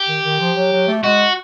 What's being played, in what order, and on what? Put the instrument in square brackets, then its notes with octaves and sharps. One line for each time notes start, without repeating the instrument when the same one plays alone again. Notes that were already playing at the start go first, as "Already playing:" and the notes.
Already playing: [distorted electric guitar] G4
[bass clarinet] D#3
D#3
F3
F#3
F#3
A3
[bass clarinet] G#3 [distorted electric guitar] F#4